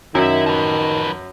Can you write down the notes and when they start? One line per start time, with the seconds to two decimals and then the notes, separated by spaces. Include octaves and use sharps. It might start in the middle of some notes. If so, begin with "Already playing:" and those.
0.15 F#2 D#3 E4 E5
0.46 F3 B4